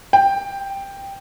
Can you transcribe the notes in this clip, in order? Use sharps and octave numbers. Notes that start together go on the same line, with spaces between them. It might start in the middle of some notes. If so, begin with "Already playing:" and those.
G5